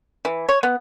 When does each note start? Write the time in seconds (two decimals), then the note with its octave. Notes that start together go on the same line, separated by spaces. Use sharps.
0.25 E3
0.49 C#5
0.63 B3